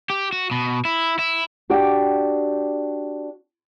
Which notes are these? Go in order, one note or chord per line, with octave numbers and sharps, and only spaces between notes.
G4
F#4
B2
E4
E4
D4 F#4 G4 D5 F#5 G5